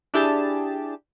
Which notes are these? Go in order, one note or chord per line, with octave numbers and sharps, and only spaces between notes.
D4 E4 G4 G#4 A5